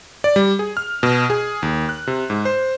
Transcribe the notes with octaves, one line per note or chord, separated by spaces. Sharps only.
D5
G3
G#4
F6
B2
G#4
D#2
F#6
C3
G#2
C5